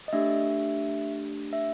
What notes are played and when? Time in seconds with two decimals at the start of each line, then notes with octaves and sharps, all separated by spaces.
0.08 D#5
0.13 A3 D4 G4 E5
1.53 E5